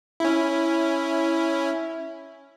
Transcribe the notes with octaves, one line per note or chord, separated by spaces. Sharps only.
C#4 E4